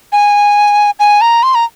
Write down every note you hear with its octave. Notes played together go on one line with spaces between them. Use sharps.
G#5
G#5
A#5
C6
A#5